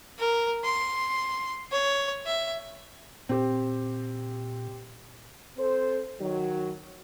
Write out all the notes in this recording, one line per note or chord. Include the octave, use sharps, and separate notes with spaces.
A#4
C6
C#5
E5
A#2 C4 G4
C4 A4 C5
D#3 F#3